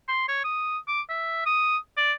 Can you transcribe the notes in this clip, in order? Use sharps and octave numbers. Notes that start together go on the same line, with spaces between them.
C6
C#5
D#6
D6
E5
D#6
D5